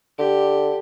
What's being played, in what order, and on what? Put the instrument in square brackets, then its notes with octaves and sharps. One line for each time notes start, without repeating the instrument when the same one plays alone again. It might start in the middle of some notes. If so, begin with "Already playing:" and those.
[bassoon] D3 [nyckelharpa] G4